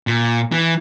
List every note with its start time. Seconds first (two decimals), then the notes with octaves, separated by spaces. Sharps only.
0.07 A#2
0.52 E3